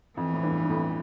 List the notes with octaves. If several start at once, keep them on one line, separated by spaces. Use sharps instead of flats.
F2 E3
A2
E2 G2
G2
F2 A2